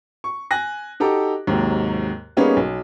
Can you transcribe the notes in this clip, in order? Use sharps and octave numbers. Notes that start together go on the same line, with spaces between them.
C#6
G#5 F#6 A#6
D#4 F#4 G4 A4 A#5 D6
D#2 G#2 C3 F#3
G3 A#3 B3 C#4 D#4 G#4
B1